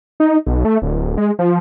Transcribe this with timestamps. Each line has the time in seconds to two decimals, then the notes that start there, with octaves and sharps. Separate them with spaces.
0.20 D#4
0.46 B1
0.65 A3
0.82 D1
1.18 G#3
1.39 F3